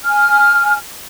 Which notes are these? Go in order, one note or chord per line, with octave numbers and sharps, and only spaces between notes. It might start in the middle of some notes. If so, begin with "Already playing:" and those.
G#5 F6